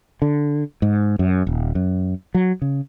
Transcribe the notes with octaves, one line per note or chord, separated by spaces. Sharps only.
D3
G#2
F#2
D#1
F#2
F#3
C#3